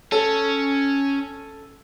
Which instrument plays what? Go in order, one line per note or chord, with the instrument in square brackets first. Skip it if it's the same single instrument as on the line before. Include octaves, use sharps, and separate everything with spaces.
[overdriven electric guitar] C#4 [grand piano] A4